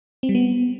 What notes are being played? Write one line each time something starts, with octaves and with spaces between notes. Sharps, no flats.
C4
G3
B3